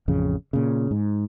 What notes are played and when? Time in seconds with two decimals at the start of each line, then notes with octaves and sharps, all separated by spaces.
0.08 A1 F2 C#3
0.53 A#2 C#3
0.91 G#2